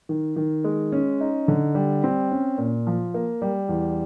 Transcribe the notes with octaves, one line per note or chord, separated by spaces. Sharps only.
D#3
D#3
G#3
C#4
D#4
D3
G3
C4
C#4
A#2
F3
A#3
G3
E2